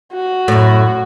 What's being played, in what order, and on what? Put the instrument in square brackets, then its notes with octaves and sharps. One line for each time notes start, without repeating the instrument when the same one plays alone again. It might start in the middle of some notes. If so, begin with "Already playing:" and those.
[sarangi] F#4
[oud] F#2 A2